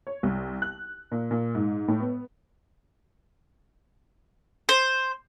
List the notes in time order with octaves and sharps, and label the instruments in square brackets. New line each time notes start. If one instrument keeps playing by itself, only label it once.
[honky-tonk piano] C#5
C2
F#6
A#2
A#2
G#2
A2
B3
[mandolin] C5